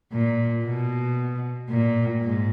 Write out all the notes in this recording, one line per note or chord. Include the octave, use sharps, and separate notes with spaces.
A#2
B2
A#2
G#2